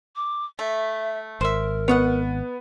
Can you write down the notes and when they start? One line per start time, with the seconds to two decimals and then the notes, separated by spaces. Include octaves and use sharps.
0.16 D6
0.59 A3 E5
1.41 G#1 A#4 C5 E5
1.88 B3 C#5 D#5 F#5